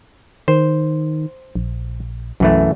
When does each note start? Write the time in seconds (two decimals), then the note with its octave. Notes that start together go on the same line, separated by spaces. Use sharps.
0.48 D#3 C5
1.55 A#1
2.40 B1 F#2 E3 A3